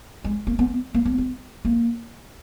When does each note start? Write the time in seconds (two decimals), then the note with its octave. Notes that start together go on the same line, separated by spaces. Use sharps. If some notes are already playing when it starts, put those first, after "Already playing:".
0.24 G#3
0.47 A#3
0.59 B3
0.94 A#3
1.05 B3
1.18 B3
1.65 A#3